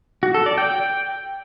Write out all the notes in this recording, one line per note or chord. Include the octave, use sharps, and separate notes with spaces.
F#4
A4
D5
G5